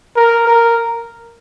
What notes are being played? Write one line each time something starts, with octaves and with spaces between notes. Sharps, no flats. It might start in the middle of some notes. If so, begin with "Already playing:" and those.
A#4
A#4